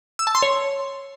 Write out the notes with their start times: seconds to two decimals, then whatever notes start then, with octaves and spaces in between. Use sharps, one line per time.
0.19 E6
0.27 A5
0.35 C6
0.42 C#5